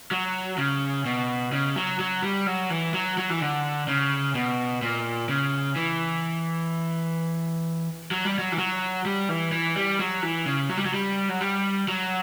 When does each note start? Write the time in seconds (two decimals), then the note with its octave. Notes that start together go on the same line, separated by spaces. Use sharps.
0.11 F#3
0.58 C#3
1.05 B2
1.53 C#3
1.76 F#3
1.99 F#3
2.23 G3
2.46 F#3
2.70 E3
2.94 F#3
3.18 F#3
3.30 E3
3.41 D3
3.88 C#3
4.35 B2
4.82 A#2
5.29 C#3
5.76 E3
8.11 F#3
8.25 G3
8.38 F#3
8.52 E3
8.58 F#3
9.05 G3
9.29 E3
9.52 E3
9.76 G3
9.99 F#3
10.23 E3
10.46 C#3
10.70 F#3
10.77 G3
10.85 F#3
10.94 G3
11.29 F#3
11.41 G3
11.88 F#3